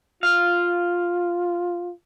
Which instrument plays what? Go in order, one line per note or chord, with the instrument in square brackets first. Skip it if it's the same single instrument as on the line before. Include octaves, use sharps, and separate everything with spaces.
[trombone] F4 [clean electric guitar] F5